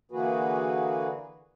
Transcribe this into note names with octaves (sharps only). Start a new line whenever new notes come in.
D3 E3 A#3 F#4 G#4 B4